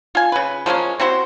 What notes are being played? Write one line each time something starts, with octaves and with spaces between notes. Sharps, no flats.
F4 G#5
C#3 B4
F3 G#3 A#3 C#4
C4 E4 F#4 C5